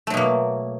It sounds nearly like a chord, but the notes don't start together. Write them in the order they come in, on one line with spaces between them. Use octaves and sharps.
A3 F#3 B2 A#3